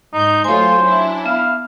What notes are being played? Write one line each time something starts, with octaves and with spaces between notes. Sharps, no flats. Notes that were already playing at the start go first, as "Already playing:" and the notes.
G#2 D#4 G6
F#3 A3 F4 C5 C#5 G#5
D4 E4
B3 F5